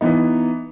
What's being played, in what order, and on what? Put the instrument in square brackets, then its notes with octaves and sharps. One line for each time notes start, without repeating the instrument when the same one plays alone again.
[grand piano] E3 B3 D#4